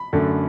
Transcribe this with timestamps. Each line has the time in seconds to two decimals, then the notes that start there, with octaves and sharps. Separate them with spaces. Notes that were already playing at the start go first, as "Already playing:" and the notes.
Already playing: B5
0.13 F#2 D3 A3